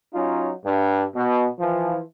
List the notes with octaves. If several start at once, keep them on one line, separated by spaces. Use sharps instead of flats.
F#3 C#4 D#4 F4
G2
B2
E3 F3